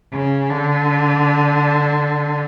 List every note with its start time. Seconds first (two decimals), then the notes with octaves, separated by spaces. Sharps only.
0.13 C#3
0.50 D3